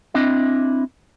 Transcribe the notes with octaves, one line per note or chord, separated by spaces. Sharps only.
C4 D4 E4 D#5